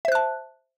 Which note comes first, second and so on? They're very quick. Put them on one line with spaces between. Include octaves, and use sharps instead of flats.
E5 C5 F#6 A5